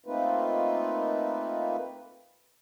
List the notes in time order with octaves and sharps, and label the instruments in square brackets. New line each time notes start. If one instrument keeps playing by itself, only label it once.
[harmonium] A3 A#3 C4 D#4 F4 B4